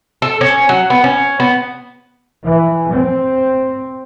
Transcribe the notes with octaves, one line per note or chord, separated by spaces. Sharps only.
A4
C#4
F#3
B3
C#4
B3
E3
C4